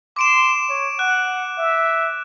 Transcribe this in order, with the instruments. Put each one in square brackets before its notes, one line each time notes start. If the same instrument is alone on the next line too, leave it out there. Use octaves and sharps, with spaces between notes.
[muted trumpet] C6 [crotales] D6 D7 E7
[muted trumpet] C#5
[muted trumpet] F#5 [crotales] F#6
[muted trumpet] E5